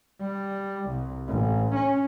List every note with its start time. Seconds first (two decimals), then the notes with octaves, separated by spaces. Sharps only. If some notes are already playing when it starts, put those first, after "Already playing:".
0.21 G3
0.89 C2
1.28 A1
1.75 C#4